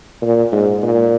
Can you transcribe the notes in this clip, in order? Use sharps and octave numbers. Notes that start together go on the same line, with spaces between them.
A#2
G#2
A#2